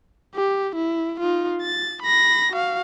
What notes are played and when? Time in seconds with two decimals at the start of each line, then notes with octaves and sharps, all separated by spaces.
0.35 G4
0.76 E4
1.20 D#4 F4
1.62 A6
2.02 B5 A#6
2.52 F#4 F5